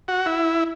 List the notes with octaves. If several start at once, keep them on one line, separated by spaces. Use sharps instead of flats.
F#4
E4